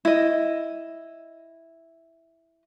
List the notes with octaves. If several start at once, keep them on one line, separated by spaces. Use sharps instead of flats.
E4 D#5